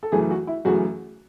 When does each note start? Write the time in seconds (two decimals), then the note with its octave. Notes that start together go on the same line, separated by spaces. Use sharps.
0.03 A4
0.12 F#2 C#3 E3 A3 G#4
0.31 F#4
0.47 E4
0.65 F#2 C#3 E3 A3 F#4